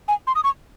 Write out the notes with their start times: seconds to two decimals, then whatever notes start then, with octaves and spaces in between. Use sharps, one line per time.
0.08 G#5
0.27 C6
0.35 D#6
0.44 C#6